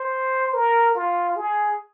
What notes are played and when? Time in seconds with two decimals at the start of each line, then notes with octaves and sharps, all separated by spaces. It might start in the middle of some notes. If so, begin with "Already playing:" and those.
Already playing: C5
0.54 A#4
0.95 F4
1.36 G#4